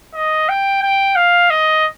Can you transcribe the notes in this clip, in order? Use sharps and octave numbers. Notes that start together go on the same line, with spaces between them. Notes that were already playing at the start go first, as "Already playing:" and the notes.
D#5
G5
G5
F5
D#5